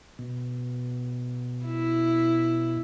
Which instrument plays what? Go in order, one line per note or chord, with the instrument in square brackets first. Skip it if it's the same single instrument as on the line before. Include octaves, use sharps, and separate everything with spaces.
[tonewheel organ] B2
[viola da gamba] E4